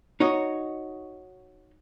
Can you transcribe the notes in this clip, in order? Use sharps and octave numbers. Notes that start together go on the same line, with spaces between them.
D#4 F#4 C#5 D#5